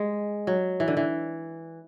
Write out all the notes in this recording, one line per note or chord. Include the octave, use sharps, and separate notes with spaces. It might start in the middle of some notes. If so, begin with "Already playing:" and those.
Already playing: G#3
F#3
E3
D3
E3